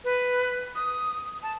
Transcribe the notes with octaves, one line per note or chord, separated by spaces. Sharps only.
B4
D#6
A5